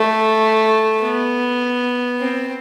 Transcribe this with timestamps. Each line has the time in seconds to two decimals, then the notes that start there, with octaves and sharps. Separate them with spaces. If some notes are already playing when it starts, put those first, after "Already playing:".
Already playing: A3
1.02 B3
2.21 C4